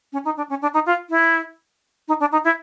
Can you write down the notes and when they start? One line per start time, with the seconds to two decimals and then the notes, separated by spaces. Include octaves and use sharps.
0.13 C#4
0.25 D#4
0.37 D4
0.49 C#4
0.62 D4
0.74 D#4
0.86 F4
1.10 E4
2.08 D#4
2.20 D4
2.32 D#4
2.44 E4